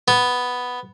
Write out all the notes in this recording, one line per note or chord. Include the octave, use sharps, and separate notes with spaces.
B3